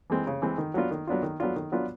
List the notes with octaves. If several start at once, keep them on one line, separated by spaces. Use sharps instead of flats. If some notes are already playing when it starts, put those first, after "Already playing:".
E3 G#3 C4
C#3
E3 G#3 C4
D#3
F#3 B3 D4 F4
D#3
F#3 B3 D4 F4
D#3
F#3 B3 D4 F4
D#3
F#3 B3 D4 F4